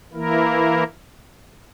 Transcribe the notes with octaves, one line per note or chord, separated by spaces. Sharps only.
E3 A#3 E4 A#4